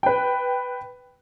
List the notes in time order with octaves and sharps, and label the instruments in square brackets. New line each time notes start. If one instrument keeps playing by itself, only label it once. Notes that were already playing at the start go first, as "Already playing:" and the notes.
[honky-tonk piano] B4 G5